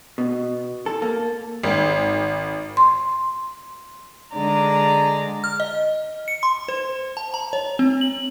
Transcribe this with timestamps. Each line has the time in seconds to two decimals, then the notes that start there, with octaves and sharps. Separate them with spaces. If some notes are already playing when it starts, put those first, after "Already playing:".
0.18 B2
0.86 A4
1.02 A#3
1.63 G#1
2.77 C6
4.33 D3 G#3 D5 A#5
5.44 F6
5.60 D#5
6.28 C#7
6.43 C6
6.68 C5
7.17 A5
7.34 A#5
7.53 C#5
7.79 C4
8.01 F#7